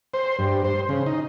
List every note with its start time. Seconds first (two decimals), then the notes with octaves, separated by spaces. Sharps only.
0.14 C5
0.39 G2
0.64 C5
0.89 C#3
1.06 D#4